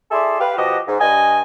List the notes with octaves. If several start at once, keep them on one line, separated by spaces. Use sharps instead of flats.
E4 G#4 A4 D5 E5 C6
G4 B4 F5
B2 F3 F#4 G4 D#5
G#2
G2 D#5 G#5